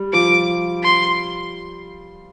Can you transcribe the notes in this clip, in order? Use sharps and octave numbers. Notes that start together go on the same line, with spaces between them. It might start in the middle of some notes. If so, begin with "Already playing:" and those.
Already playing: G3
F3 D6
C6